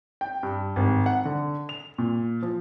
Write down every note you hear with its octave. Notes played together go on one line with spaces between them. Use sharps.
G5
G2
G#1
F#5
D3
F7
A#2
F3